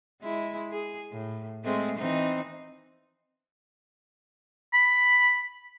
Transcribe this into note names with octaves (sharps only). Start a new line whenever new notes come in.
G#3 E4
G#4
A2
G#3 A3 C4
E3 C4 D#4
B5